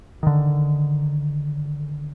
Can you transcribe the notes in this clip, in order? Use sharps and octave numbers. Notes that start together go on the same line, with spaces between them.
D3 D#3